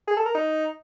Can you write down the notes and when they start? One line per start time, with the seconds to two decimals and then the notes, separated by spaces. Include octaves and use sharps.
0.08 G#4
0.17 A4
0.26 A#4
0.35 D#4